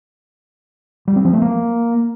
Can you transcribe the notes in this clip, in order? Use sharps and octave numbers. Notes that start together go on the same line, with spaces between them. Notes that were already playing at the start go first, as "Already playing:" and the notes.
G3
C4
F3
A3
A#3